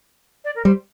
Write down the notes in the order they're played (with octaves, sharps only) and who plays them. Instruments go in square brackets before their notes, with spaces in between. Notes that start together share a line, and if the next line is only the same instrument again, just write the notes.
[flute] D5
A#4
[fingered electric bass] G3 [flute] C5